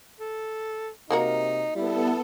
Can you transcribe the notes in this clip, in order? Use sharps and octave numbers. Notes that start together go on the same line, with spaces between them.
A4
C3 A#3 D#4 F#4 A#4
G3 B3 E4 A4